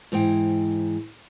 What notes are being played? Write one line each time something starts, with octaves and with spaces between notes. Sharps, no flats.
G#2 E3 C5 G5